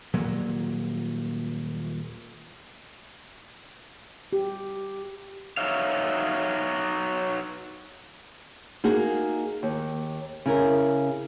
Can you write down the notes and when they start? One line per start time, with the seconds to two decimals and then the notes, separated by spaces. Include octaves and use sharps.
0.13 D#1 A#2 F#3 A#3
4.33 G4
5.57 F#3 D#4 C#5 E5 F5
8.84 A#3 D#4 F#4 G#4
9.63 D#2
10.46 C#3 E4 A#4